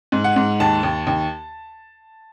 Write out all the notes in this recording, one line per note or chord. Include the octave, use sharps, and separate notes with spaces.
G#2
F#5
G#2
D#2 A5
D#2
D#2